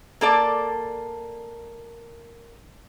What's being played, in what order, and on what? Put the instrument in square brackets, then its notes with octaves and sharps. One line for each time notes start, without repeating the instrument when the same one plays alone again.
[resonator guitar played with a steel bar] A#3 A4 D5